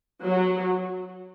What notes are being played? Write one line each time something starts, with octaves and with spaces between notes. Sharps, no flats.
F#3